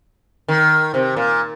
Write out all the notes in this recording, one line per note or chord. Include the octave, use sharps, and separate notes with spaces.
D#3
C3
A#2